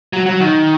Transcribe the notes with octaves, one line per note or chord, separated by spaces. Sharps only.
F#3
F#3
D#3